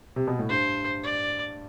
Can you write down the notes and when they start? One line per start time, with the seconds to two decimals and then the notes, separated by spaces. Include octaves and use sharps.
0.16 C3
0.27 B2
0.39 A2
0.49 G2 C5
1.04 D5